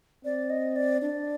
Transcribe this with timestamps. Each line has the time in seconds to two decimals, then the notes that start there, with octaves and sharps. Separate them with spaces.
0.24 C4 D5
0.50 D#5
0.76 D5
1.02 D4 D5